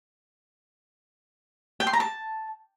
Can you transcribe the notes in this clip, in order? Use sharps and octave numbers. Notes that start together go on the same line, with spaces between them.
G5
C6
A#5
A5